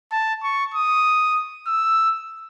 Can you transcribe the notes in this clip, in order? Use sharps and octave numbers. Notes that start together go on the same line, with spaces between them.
A5
C#6
D#6
E6